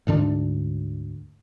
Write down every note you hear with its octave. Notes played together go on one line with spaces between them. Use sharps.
D2 G#2 D3 D4